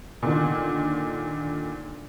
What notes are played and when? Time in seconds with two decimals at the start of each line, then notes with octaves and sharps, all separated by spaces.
0.23 A#2 D3 D#3